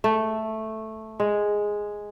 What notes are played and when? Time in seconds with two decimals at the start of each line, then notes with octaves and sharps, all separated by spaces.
0.04 A3
1.20 G#3